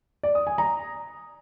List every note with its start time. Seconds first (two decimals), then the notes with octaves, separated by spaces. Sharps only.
0.23 D5
0.35 D#6
0.47 G#5
0.58 A#5